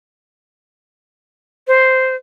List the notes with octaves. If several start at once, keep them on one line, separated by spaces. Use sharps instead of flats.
C5